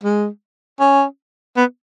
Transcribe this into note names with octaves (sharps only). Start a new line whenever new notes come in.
G#3
C#4
B3